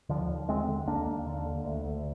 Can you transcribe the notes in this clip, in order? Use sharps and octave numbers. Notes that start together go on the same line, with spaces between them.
D#2 D3 F3
D#2
D3 G#3 C4
D3
D#2 A#3 D4
D#2
D3
D3
D2
D2